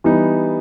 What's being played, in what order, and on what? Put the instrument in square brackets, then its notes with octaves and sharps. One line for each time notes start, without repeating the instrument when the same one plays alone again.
[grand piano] E3 G3 B3 D#4